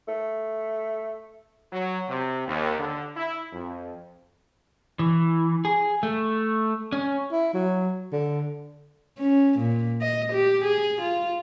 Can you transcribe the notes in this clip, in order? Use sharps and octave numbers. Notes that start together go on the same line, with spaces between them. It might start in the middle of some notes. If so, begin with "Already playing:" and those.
A3
F#3
C3
D#2
D3
E4
F2
E3
G#4
A3
C#4
E4
F#3
D3
C#4
A#2
D#5
G4
G#4
F4